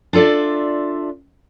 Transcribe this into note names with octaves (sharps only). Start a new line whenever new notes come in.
D4 F4 A4 D5 E5